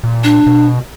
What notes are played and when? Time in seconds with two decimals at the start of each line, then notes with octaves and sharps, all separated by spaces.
0.04 A#2
0.24 D4
0.47 B2